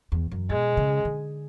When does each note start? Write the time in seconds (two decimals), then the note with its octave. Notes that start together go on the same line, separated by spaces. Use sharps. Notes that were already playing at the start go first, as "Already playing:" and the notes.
0.12 E2
0.32 F#2
0.50 B2 G#3
0.77 C#3
1.05 D3